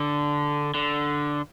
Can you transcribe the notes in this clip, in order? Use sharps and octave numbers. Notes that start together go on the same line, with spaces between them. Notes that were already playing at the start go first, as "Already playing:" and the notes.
Already playing: D3
D3